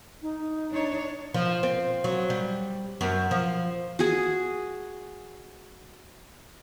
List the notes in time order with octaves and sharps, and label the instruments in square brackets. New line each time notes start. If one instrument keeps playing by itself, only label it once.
[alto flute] D#4
[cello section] D4 C#5
[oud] F3
C4
F#3
G3
F#2
F3
[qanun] F#4 G#4